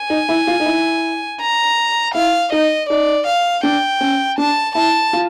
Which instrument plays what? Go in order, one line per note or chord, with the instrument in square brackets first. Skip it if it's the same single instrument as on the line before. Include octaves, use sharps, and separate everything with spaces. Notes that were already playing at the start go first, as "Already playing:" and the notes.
Already playing: [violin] G#5
[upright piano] D#4
E4
F4
D#4
E4
[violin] A#5
[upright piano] E4 [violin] F5
[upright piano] D#4 [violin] D#5
[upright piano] D#4 [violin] D5
[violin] F5
[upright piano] D4 [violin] G5
[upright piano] C#4
[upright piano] D4 [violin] A5
[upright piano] E4 [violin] A5
[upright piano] F4